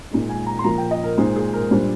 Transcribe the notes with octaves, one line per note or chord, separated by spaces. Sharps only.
A#2 G#3 D#4
G#5
A#5
C6
A#2 F3 A#3 A#5
G5
D#5
A#4
A#2 G#3 D#4 C5
G#4
A#4
A#2 G3 D4 C5